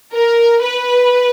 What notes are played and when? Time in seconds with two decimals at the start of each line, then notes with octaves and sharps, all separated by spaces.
0.11 A#4
0.61 B4